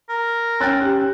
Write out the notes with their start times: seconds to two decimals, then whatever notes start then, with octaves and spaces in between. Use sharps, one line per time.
0.09 A#4
0.60 C#4 G5 E6 F#6 A6
0.81 G4